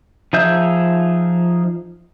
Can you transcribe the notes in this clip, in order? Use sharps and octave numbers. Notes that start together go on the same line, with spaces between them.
F3 D#4 G#4 E5 G6